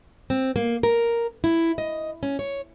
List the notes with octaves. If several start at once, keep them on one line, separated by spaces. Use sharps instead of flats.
C4
A#3
A#4
E4
D#5
C#4
C#5